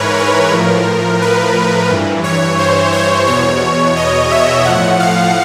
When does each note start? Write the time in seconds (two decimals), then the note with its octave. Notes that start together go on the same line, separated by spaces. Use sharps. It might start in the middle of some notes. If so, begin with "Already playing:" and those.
Already playing: G#2 E3 A#4 B4 C#5
0.18 A#4
0.52 A2 F3
1.22 B4
1.90 G2 E3
2.24 C#5
2.59 C5
2.93 C#5
3.27 E2 B2 C#5
3.96 D#5
4.31 E5
4.65 A2 F3 F#5
5.00 F5